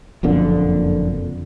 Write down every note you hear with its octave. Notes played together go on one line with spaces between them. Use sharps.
F#1 F2 A#2 D3